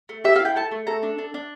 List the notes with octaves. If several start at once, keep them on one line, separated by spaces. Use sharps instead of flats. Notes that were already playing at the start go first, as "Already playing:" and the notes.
A3
G4 E5
F5
E4
G5
A3 A5
A3
A4 A#5
D4
D4
D4